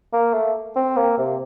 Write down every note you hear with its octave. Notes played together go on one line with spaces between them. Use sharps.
A#3
A3
C4
A#3
C3